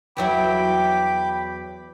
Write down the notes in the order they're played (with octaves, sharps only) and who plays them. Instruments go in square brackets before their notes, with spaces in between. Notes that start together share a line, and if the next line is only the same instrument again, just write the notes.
[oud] E2 F#3 E4 [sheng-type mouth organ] G5 B5 D6